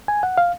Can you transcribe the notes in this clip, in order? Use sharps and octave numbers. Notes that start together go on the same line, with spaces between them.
G#5
F#5
F5